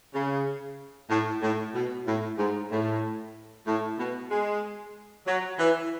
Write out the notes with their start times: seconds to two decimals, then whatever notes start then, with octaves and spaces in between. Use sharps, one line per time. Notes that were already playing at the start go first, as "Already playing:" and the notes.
0.14 C#3
1.10 A2
1.42 A2
1.74 B2
2.07 A2
2.38 G#2
2.71 A2
3.67 A2
3.99 B2
4.31 G#3
5.27 F#3
5.59 E3